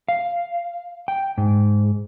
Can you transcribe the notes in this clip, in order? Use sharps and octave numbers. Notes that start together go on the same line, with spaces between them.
F5
G5
G#2